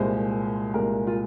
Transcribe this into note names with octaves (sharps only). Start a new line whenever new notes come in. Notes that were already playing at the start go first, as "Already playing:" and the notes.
Already playing: C2 A#2 G#3 C5
C2 A#2 G#3 A#4
F4